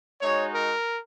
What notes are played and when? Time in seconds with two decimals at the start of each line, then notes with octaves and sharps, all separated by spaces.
0.21 G#3 D#4 F#4 C#5
0.54 A#4